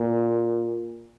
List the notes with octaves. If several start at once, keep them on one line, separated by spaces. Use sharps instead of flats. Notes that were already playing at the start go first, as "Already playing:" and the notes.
Already playing: A#2